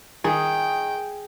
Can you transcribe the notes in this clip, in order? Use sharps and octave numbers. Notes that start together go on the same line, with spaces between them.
D#3 G#4 G5